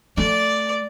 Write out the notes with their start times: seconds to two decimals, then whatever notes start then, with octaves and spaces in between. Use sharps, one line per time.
0.17 A3 D5